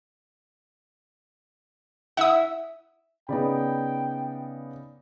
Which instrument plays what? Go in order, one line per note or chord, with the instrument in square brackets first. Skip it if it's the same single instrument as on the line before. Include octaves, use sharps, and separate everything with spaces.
[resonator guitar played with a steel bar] E4 E5 [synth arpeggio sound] F#5 D#6
[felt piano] C#3 B3 [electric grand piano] D#4 D5 B5 [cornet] G5